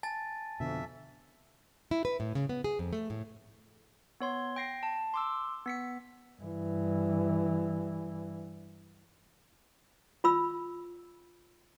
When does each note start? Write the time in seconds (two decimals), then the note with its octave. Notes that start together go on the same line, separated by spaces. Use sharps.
0.03 G#5 A5 A6
0.60 F2 B2 D3 C4 E5
1.91 E4
2.05 B4
2.20 A2
2.35 C#3
2.49 B3
2.64 G#4
2.79 F2
2.93 A3
3.10 A2
4.20 B3 C#5 C6
4.56 G5 A#6 C7
4.83 A5
5.14 C6 D6 E6
5.66 B3 B6 C#7
6.40 G2 E3
10.24 F4 B5 E6